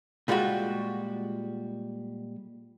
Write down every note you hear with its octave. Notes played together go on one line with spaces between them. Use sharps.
A#2 G3 G#3 F4 F#4